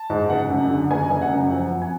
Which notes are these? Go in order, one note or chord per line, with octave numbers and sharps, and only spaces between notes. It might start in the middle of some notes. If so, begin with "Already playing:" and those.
Already playing: A5
G#2
F#1 F#5
F#2
D3
F#1 G#5
F#1
F#5
F#2
F3 F#5
F2
G#5